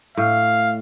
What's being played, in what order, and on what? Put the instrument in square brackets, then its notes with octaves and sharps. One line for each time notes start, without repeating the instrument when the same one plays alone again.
[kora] A2 [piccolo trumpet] F5